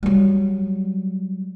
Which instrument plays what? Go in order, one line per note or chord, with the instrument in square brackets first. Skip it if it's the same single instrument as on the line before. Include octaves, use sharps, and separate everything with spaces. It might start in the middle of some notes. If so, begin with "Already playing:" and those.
[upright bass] F#3 G3